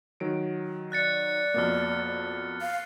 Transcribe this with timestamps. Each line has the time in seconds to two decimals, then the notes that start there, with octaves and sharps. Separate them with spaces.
0.20 D#3 F#3 D7
0.92 D5 F#6 A6 C#7
1.54 F2 B2 A#3 F6 A6
2.61 F5